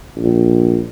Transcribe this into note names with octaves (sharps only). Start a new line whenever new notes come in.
A#1